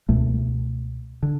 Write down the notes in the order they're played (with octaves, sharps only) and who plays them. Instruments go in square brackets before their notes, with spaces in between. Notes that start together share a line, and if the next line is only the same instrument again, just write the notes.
[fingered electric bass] C#2 B2 A3
D3